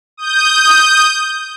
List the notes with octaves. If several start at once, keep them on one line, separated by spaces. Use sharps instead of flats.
D#6 G6